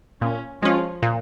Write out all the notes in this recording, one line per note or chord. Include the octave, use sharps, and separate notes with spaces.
A#2 C#4
F3 G#3 C#4 F4
A#2